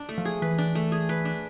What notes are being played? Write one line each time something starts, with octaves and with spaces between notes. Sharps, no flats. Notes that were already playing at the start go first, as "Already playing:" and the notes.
Already playing: D4
A3
F3
G#4
E3 B4
D4
A3
G#4
B4
D4